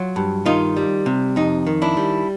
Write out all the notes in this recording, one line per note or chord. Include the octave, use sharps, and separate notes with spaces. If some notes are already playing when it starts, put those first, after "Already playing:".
Already playing: F#3 F4
G2
D#3 D#4 F4
G3
C3
F2 D#4
D#3
D4 E4
G3